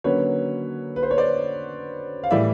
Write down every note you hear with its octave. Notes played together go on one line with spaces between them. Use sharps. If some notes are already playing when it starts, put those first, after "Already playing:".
D3 F#3 A#3 C#4 B4 C#5
B4
C5
C#5
C5 D5
F5
A2 E3 G3 D5 E5